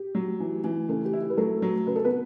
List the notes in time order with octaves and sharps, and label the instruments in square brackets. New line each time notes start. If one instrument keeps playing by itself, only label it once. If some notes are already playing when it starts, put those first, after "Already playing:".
Already playing: [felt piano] G4
[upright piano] F#3
E3
E3
[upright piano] C#3 [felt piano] A3 A4
[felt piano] G4
[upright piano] E4
[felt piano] G4
B4
[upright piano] F#3 [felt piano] A3 A4
[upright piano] F#3
[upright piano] C#3 [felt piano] B4
[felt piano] A4
B3 B4